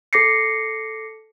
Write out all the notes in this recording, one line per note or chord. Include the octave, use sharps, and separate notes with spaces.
A4 D6 A#6 C7 C#7